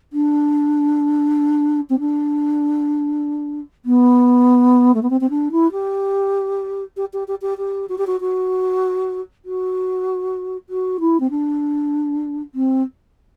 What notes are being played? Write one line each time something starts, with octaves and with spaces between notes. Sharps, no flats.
D4
C4
D4
B3
A3
B3
C4
C4
D4
E4
G4
G4
G4
G4
G4
G4
F#4
G4
F#4
F#4
F#4
F#4
E4
C4
D4
C4